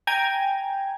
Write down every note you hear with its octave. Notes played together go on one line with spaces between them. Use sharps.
G5 G#5 A#5 G#6